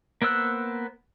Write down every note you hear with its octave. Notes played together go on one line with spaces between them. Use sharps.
A#3 B3 C5 E6 F#6